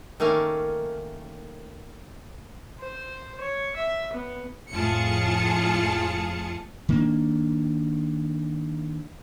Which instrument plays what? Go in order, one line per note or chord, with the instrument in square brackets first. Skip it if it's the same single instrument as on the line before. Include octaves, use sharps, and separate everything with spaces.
[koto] D#3 A3 A#3 C#4 F5
[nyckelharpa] C5
C#5
E5
B3
[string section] F2 A2 F4 G#4 A5 C#7
[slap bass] D#3 A#3 D4